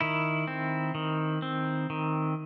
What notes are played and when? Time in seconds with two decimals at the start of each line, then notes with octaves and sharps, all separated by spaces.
0.01 D#3 E4
0.47 C4
0.95 D#3
1.42 C4
1.90 D#3